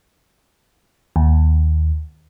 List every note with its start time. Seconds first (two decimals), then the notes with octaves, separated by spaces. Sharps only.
1.16 D#2